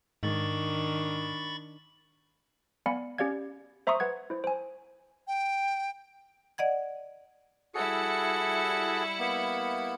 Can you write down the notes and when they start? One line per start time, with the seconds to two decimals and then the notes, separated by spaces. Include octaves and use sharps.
0.23 G#2 D#3 D4 B5 C#6 A6
2.86 B3 D5 F5 G#5 B5 C#7
3.18 C#4 G4 D5 F5 G#6
3.87 C5 E5 A#5 C6 C#6 D#6
4.00 B4 F#5 G#6
4.30 E4 C5
4.44 C5 G#5
5.27 G5
6.58 D5 D#5 F#5 G#6
7.75 G3 E4 F#4 G#4 A4 C#7
9.19 A#3 B3 B5